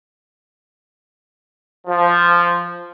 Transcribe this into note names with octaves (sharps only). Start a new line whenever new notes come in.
F3